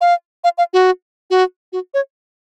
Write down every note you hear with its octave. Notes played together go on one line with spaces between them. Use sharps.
F5
F5
F5
F#4
F#4
F#4
C#5